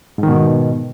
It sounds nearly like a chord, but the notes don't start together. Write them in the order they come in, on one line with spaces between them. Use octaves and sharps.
G#2 D#3 B2